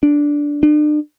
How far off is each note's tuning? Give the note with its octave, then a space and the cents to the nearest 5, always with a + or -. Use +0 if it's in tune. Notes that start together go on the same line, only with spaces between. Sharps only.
D4 -10
D4 +40